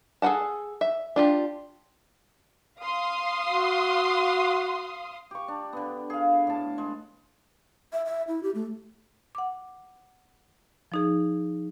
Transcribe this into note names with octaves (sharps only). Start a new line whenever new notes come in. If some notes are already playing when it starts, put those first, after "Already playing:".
G#4 A4 B4 F#5 A5
E5
D4 F4 G4
F5 C6 D#6
F#4
G4 C#6
D4
D3 B3
G#4 F5
A2 A5
G#3
E5
E5
E4
G4
A3
F#5 D6
F3 D#4 G#4